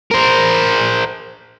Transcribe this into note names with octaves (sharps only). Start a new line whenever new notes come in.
A#4 C5